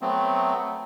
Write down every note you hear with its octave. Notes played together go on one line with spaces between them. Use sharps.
F#3 A3 B3 C4